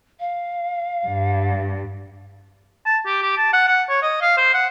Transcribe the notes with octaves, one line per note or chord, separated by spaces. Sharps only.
F5
G2
A5
G4
G4
A5
F#5
F#5
C#5
D#5
F5
C5
F#5